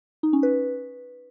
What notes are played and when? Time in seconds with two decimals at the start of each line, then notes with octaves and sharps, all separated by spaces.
0.23 D#4
0.33 C#4
0.43 B4